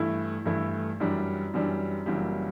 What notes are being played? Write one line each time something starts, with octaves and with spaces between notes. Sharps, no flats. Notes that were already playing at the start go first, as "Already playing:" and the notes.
Already playing: G2 E3 A3 E4
G2 E3 A3 E4
F#2 E3 G3 D4
F#2 E3 G3 D4
F#1 F#2 E3 G3